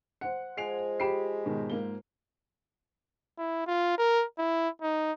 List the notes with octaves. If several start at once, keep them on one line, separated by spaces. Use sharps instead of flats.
C5 F#5 C#7
F3 G#3 G#5 C7 D7 F7
G4 B5 C7 D7 E7
G#2 B2 D#3
G#2 A#3 G7
E4
F4
A#4
E4
D#4